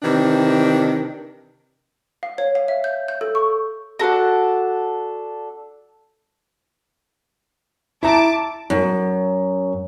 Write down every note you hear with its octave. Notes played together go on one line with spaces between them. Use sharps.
C3 D#3 E3 D4
F5
C#5
F5
E5
G6
G6
A4
C#6
D4 F#4 A4 A#4
E4 E5 A5 A#5 D6
F#2